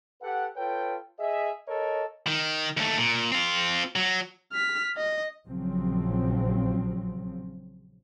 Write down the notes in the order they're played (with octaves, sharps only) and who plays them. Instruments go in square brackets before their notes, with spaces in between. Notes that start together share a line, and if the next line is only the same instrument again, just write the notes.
[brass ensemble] G4 A4 B4 F#5
F4 A4 B4 C#5 G5
G#4 D#5 E5
A4 A#4 C#5 D#5
[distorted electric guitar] D#3
D#2 A3
A#2
C4 F4
F#3
[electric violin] F6 B6
D#5
[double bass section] A#1 C#3 F3 F#3 C4